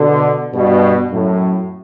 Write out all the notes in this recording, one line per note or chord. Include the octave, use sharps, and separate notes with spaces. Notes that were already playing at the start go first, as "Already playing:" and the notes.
Already playing: B2 D3
G2 B2
F#2 A2